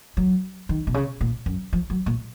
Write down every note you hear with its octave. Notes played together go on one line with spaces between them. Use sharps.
F#3
D#3
B2
C#3
A#2
F#2
F3
F#3
A#2